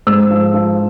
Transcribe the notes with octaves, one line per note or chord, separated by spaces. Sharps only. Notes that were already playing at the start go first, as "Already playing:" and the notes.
G#2 E6
F3
F3